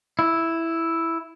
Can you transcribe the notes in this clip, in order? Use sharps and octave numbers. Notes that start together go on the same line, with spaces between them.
E4